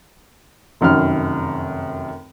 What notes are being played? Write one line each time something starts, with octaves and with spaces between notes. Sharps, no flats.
F1 F#2 D#3 F6